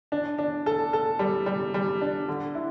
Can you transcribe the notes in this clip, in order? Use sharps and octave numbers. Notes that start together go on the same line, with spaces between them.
D4
D4
A4
A4
G3
G3
G3
D4
D3
E4